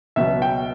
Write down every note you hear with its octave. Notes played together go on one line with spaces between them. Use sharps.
C#2 B2 F#3 E5
G5